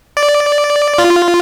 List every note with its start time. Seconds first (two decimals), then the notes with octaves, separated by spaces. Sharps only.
0.17 D5
0.98 F4